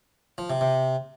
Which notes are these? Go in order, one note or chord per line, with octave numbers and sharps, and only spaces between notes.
F3
C3
C3